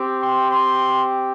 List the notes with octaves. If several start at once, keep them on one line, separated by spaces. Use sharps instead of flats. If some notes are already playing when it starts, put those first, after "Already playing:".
Already playing: C4 G4
C6
C6